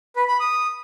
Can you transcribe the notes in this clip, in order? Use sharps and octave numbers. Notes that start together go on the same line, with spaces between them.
B4
B5
D#6